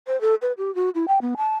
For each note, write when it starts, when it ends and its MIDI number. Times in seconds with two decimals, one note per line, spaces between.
0.07 0.19 72
0.21 0.35 69
0.42 0.52 71
0.58 0.73 67
0.75 0.90 66
0.95 1.06 64
1.08 1.19 79
1.21 1.34 59
1.37 1.56 81